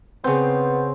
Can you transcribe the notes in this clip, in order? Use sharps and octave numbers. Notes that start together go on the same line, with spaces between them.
C#3 B3 C4 G6